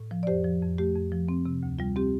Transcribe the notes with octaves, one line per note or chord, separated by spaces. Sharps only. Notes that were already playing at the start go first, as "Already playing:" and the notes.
Already playing: A2
F3
D5
F2 G4 C5
F3
F2
A3 G4
F2
F3
C4
C3
D2
G3 F4
C4 G4